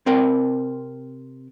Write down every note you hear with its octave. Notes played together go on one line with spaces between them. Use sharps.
C3 C4 A#4 G5